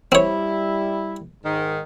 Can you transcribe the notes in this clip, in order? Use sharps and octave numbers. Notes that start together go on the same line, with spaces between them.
G3 C4 E4 C#5
G#2 D#3